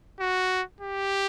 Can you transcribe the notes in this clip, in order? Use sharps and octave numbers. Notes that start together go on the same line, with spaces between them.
F#4
G4